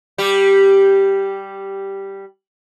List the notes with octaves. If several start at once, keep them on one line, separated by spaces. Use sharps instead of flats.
G3 G4